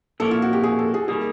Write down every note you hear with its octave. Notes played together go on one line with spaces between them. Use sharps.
A#2 F3 A#3 C#4 E4 A4
F4
F#4
G4
G#4
A4
G#4
D#3 G3 A#3 G#4